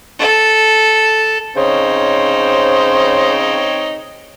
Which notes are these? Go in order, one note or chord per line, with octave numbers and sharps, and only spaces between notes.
A4
C#3 C4 D#4 C5 C#5